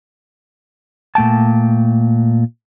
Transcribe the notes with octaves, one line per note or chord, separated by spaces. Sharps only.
A#2 A3 G5 A5